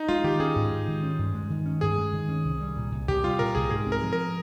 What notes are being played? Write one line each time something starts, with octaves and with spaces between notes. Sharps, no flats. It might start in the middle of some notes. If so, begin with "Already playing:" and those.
Already playing: D#4
G#3 F4
D#3 G4
C#4 G#4
G#2
G#3
D#3
C#4
G2
G#3
D#3
C#4
G2 G#4
G#3
D#3
C#4
C2
G3
A#2
C2
C2 G4
G3 F4
A#2 A#4
C2 G#4
G#2 G#4
C4
A#4
F3
A#4